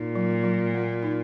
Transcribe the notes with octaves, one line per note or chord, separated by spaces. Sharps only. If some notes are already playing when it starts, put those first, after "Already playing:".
Already playing: A#2 D#4
F#3
F#3
A#3
D#4